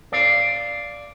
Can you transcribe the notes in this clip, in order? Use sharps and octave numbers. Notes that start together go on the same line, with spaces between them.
D5 F5